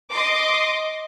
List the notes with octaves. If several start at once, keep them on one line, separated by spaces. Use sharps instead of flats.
D#5 C6 D6